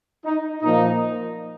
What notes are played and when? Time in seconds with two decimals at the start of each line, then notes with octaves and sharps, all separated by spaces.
0.24 D#4
0.62 A#2 F3 A#3 D#4